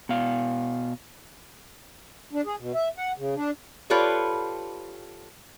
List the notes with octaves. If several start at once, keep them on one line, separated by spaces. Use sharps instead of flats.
B2 F5
D4
G#4
B2
E5
F#5
C#3
D4
F4 G4 A4 B4 C#5 D5